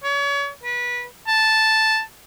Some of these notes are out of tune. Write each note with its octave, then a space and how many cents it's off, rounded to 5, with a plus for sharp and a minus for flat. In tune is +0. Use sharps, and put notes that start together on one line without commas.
C#5 +35
B4 -25
A5 +0